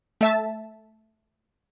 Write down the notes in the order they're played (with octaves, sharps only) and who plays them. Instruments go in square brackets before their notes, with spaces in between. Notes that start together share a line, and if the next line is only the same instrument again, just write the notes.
[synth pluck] A3 E5 A5